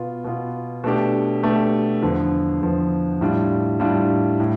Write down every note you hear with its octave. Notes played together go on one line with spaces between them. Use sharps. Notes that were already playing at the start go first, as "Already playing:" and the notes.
Already playing: B2 B3 F4
B2 B3 F4
B2 A3 D4 G4
B2 A3 D4 G4
E2 D3 F3
E2 D3 F3
A2 G3 D4 F4
A2 G3 D4 F4
A2